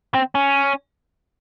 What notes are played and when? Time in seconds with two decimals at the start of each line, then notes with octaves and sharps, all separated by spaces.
0.14 C4
0.35 C#4